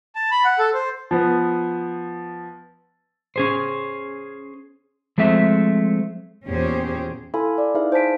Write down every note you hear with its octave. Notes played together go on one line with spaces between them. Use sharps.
A5
B5
F#5
A4
C5
F3 B3
C#4 G#4 C5
F3 G#3 A3 C4 E5
E2 A#2 C#4 G4 G#4 C5
E4 A4 F5 G#5 B5 C6
D5
D#4 E4 G#4 B4 E5 F5
C5 G#5 A5 B6 D7